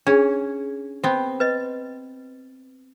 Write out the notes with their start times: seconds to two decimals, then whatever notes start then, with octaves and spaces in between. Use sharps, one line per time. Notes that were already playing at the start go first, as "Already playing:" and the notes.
0.07 C#4 D4 G#4
1.04 B3 C4
1.40 B4 D#5